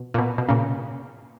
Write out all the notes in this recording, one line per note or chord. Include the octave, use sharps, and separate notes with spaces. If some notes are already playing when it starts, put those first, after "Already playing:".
Already playing: B2
A#2
B2
B2
A#2 C#3